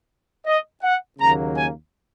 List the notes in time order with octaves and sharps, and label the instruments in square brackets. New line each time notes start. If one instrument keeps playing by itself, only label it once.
[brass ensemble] D#5
F#5
D#2 C#3 F#3 A#3 A#5
G#5